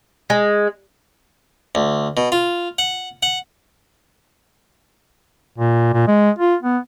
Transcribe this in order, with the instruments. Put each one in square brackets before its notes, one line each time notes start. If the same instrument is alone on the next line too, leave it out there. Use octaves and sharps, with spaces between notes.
[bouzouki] G#3
[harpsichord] D2
B2
F4
F#5
F#5
[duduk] A#2
A#2
G#3
F4
B3